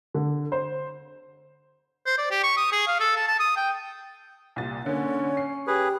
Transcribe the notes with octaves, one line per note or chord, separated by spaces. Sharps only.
D3
C5
C5
D5
G4
C#6
D#6
G#4
F5
A4
A5
A5
D#6
G5
C2 A#2 A6
D3 A#3 C#4 C#5
C7
G4 G#4 B4